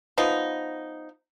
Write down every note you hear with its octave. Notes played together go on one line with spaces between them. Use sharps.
F3 B3 D#4